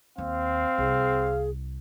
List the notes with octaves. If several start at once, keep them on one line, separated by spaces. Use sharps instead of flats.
D#2 C4 F5
C2 G#4